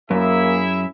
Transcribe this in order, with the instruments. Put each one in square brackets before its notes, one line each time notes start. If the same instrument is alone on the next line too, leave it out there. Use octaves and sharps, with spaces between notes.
[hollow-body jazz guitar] F#2 [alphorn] A#3 [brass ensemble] E4 G#4 E5